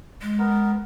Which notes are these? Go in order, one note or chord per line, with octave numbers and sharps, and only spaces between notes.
G#3
B3 A#4